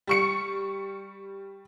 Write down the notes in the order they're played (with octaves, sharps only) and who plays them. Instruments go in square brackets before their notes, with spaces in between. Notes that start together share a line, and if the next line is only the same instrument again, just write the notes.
[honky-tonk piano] G3 C#6 C#7